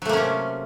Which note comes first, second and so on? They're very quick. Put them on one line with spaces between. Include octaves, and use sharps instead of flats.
F#3 A3 A#3 C#4 C3